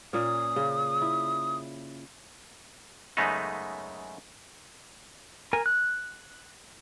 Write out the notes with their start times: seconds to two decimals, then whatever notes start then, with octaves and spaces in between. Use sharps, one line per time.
0.13 A#2 C#4 D#6
0.55 C#3 C5
1.01 E4
3.17 F#2 C#3 G#3 A3 B3 D#4
5.53 A#4 G#5
5.66 F#6